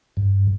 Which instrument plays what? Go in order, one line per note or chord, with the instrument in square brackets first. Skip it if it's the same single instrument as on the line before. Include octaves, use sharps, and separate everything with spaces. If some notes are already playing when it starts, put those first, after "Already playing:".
[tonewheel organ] G2